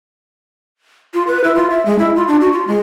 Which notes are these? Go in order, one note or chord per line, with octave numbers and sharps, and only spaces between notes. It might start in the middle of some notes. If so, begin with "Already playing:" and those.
F4
B4
E4
F4
E5
G#3
E4
F4
D4
F#4
F4
G#3